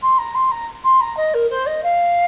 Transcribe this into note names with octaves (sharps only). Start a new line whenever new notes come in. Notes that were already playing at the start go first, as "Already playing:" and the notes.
C6
A#5
C6
A#5
C6
A#5
D#5
A#4
C5
D#5
F5